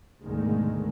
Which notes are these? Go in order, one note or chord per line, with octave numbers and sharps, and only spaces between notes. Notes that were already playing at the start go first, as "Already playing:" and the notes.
G#1 D2 G#2 B2 D#3 G#3